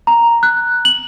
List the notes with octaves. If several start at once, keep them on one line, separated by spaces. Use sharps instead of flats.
A#5
F#6
F#7